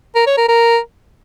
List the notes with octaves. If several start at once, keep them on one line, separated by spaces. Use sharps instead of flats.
A#4
C#5
A#4
A#4